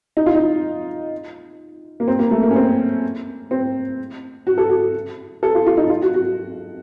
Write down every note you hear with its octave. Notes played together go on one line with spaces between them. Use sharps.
D#4
F4
D#4
A#3
C4
A#3
A3
A#3
C#4
C4
C4
F#4
A4
F#4
A4
F4
F4
D#4
F4
F#4
F#4